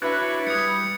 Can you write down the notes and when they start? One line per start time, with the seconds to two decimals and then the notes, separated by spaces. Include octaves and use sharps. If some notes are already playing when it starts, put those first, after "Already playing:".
0.02 D4 E4 F#4 B4 C#5 F#6
0.47 G3 D#6 G#6 C#7